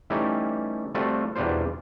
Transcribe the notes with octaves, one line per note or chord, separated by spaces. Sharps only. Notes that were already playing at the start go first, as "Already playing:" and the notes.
E3 G3 A3 C#4 D#4 G4
G3 A3 C4 F4 F#4 A4
E2 B2 G3 D4 F4 C5